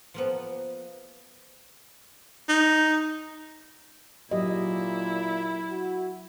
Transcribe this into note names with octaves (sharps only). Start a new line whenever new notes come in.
F3 A#3 B3
D#4
A#2 F#3 E4 G4 D#5
F#4